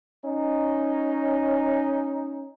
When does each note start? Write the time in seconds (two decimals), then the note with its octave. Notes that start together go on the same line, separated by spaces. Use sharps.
0.24 C#4 D#4